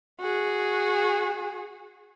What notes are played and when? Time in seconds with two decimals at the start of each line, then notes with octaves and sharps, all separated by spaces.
0.20 F#4 G#4